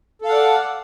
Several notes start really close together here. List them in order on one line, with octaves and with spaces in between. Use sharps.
A4 F5 F#5 D5